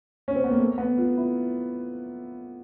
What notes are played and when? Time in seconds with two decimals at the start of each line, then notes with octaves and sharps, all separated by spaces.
0.28 C#4
0.36 C4
0.44 B3
0.51 A#3
0.59 A3
0.78 B3
0.98 F4
1.17 E4